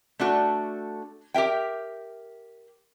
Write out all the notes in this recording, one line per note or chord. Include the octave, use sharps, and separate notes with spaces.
A3 D4 F#4 A4
G4 A#4 E5 G5